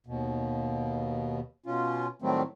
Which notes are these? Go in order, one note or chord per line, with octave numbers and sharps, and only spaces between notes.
D#2 B2
B2 C#4 F4
A2 D#3 F#3 G3 A3 C4